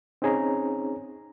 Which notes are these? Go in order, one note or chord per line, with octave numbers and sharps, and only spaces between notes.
C4 C#4 D#4 G#4 C#5 A#5